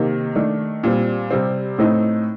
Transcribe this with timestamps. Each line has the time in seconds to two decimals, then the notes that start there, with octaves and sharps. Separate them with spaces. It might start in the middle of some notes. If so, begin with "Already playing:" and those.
Already playing: C3 D#3 A#3
0.35 D#3 A3 D4
0.84 A#2 G3 C4
1.31 C3 G3 C4
1.78 A2 A3 C4 D#4